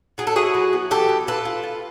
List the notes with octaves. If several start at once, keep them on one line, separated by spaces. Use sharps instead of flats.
F#3 G#4
A4
E4 F#4 G#4
F#3
B3
E3 G4 A4
E3
F4 A4 B4
F4
F4